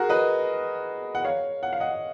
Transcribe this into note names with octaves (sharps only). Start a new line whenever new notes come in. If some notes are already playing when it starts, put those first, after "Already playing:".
Already playing: F#4 G#4 A#4
B4 D#5
F#5
C#5 F5
F#5
F5
D#5 F#5